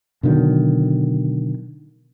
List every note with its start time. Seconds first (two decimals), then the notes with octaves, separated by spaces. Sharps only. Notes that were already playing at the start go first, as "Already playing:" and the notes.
0.23 B2 D3 D#3 F#3